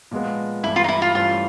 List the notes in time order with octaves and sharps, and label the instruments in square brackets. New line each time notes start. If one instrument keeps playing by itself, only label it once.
[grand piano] A#2 F3 G#3 B3
[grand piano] G2 E3 A3 [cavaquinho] E4
[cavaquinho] F4
D#4
E4
F4
[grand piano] G2 E3 A3 C#4 [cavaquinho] F4